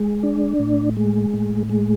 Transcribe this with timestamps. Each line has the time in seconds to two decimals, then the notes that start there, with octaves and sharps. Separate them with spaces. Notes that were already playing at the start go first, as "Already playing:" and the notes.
Already playing: G#3
0.23 D4
0.60 A2
0.97 G#3
1.33 A2
1.70 G#3